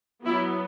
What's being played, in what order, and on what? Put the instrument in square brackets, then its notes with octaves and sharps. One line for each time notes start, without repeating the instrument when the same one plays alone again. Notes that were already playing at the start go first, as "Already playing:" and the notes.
[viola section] F#3 B3 E4